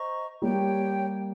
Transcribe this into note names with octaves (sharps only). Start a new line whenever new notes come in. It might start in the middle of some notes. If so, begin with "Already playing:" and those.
Already playing: C5 D#5 A#5 C#6
G3 A#3 G4 C#5 G5